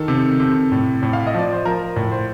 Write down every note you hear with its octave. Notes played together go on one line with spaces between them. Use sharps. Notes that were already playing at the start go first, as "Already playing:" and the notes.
Already playing: D#3 A4
C3
C3
A2
A2
F5
D#5
F3 D5
C5
F3 A#4
A2
C5